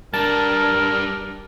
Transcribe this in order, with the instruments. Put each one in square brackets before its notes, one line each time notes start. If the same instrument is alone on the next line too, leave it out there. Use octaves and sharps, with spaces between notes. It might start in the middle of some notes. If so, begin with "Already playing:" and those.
[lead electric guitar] G3 D4 [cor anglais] A#4 [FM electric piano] A5